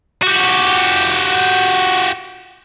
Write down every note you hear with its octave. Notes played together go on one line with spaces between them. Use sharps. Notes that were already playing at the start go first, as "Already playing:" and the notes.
F#4 G4